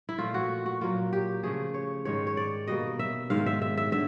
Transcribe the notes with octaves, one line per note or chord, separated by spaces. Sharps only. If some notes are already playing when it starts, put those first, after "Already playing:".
E4
A#2 F3 A3 F4
F#4
F#4
A#2 F#3 A#3 F4
G4
C#3 F3 A3 G#4
C#5
G#2 D#3 G#3 C#5
C#5
D5
B2 G3 A#3 D#5
E5
G#2 D#3 G#3 F5
E5
E5
E5
D3 E5